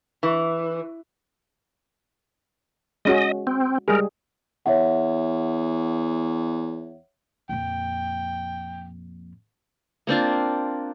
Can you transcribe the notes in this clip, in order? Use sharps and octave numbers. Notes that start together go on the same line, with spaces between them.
E3
G#3 C#4 F#4 D#5
C4
G3 G#3 G#4 A#4
E2 C#5 E5 F#5
F2 A#2 G5
A#3 C4 D4 F4